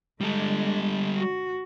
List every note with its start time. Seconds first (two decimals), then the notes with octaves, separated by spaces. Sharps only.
0.21 D3 G3 G#3 A4
1.16 F#4